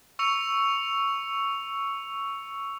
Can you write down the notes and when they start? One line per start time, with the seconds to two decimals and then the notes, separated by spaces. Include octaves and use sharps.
0.19 C#6 E6 C#7 F7